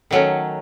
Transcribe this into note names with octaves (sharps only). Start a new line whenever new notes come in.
D#3 F#3 A3 C#4